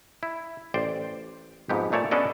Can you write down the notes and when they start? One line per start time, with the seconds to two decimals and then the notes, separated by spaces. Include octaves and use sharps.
0.23 E4
0.74 A1 C5 D5 G5
1.69 F2 G#2 B3 G4
1.92 A#2 A3 C#5 D5 A5
2.11 B3 C#4 D4 A4 D5 D#5